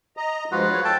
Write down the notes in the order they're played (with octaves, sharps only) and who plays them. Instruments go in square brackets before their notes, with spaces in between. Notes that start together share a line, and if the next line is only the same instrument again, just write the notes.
[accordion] D#5 A#5
[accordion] G2 F3 G#3 [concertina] F4 F#4 B4
[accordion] C#5
[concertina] A4 G5 A5